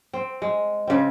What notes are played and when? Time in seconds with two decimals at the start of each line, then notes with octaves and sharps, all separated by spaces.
0.13 C4
0.42 G#3
0.88 C#3 C4